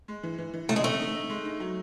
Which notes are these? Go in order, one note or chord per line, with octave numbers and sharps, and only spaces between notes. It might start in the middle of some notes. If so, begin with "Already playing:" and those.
G#3
E3
E3
E3
C#3 A3
G#3
A3 C4
D#4
D#4
G#3
D#4
F#3